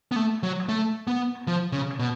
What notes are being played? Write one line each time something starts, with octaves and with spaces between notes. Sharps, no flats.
B3
A3
F#3
A3
B3
F3
C#3
B2